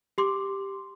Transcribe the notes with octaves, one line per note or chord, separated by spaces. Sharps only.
G4 C6 D6